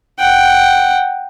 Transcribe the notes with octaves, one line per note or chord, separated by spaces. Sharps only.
F#5 G5